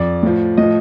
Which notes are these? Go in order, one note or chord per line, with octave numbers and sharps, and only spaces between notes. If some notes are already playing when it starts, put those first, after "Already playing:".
Already playing: F2 D5
A2 F3
A2 F3 D#5